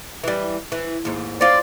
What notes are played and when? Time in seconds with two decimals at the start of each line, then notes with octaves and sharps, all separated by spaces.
0.24 E3 G3
0.72 E3
1.05 D#2 G#2
1.41 C4 F4 D5